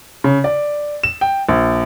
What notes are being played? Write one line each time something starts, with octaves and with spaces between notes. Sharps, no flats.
C#3
D5
E7
G5
A#1